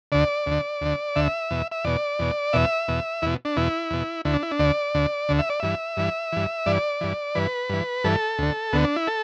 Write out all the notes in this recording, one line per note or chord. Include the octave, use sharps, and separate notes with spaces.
D2 D3 D5
D2 D3
D2 D3
D2 D3 E5
E2 B2
E5
E2 B2 D5
E2 B2
E2 B2 E5
E2 B2
E2 B2 E4
D4
E2 B2 E4
E2 B2
D2 D3 E4
D4
E4
D4
D2 D3 D5
D2 D3
D2 D3
E5
D5
G2 E3 E5
G2 E3
G2 E3
G2 E3 D5
G2 E3
G2 E3 B4
G2 E3
G2 E3 A4
D2 D3
D2 D3 B3
D4
E4
A4